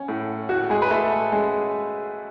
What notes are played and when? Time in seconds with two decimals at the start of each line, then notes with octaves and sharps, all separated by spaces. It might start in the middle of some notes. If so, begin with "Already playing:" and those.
Already playing: C#4
0.08 A2
0.49 A2 F#4
0.70 G#3 G#4
0.82 B4
0.91 A2 A3 A4
1.32 G#3 C#4 G#4